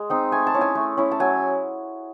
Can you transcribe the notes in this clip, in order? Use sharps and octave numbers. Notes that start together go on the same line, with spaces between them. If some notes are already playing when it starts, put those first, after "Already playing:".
Already playing: G#3
C4 D#4
A3 G#5
A5
C#4 E4
G#5
A3
C#4 E4
A5
F#3 G#5